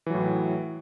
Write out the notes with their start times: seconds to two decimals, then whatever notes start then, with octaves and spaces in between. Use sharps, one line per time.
0.06 E3
0.10 F#3
0.14 A2